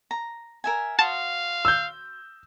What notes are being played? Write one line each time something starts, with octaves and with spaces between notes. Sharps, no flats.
A#5
A#4 E5 G#5
F#4 C5 F5 A5 D#6
E6 G6